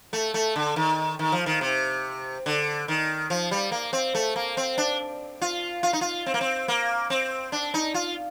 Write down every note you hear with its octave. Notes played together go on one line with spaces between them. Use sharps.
A3
A3
D3
D#3
D#3
F3
D#3
C3
D3
D#3
F3
G3
A#3
C4
A3
A#3
C4
D4
F4
F4
D#4
F4
C4
A#3
C4
A#3
C4
D4
D#4
F4